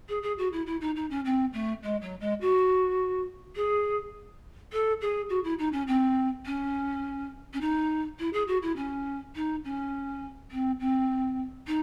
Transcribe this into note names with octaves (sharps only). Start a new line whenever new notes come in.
G#4
G#4
F#4
E4
E4
D#4
D#4
C#4
C4
A3
G#3
F#3
G#3
F#4
G#4
A4
G#4
F#4
E4
D#4
C#4
C4
C#4
C#4
D#4
E4
G#4
F#4
E4
C#4
D#4
C#4
C4
C4
D#4